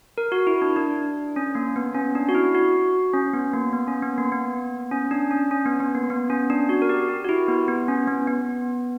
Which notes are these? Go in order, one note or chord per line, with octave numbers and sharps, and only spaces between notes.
A#4
F#4
E4
D4
D4
C#4
A#3
B3
C#4
D4
F#4
E4
F#4
C#4
B3
A#3
B3
C#4
B3
A#3
B3
C#4
D4
C#4
C#4
B3
B3
A#3
B3
C#4
D4
F#4
A#4
G4
G4
F#4
E4
B3
B3
C#4
B3
B3